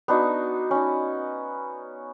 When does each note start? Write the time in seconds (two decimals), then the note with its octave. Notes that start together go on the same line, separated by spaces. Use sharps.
0.08 B3 D4 D#4 F#4
0.71 C#4 D#4